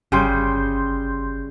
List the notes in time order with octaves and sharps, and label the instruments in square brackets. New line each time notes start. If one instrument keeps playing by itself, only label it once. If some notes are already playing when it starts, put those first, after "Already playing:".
[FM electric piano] G1 C6 G6 [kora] C#3 G3